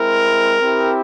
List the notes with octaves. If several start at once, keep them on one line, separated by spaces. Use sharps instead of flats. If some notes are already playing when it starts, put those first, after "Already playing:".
Already playing: G#3 C4 E4 A#4
C4 E4 G4